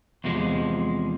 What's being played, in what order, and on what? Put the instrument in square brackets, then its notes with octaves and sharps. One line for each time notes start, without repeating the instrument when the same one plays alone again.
[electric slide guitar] E2 C3 F3 G#3